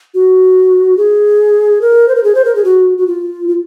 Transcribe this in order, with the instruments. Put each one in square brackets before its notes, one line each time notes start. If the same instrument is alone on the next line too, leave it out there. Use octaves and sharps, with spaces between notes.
[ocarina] F#4
G#4
A#4
C5
A#4
G#4
C5
A#4
G#4
F#4
F#4
F4
F4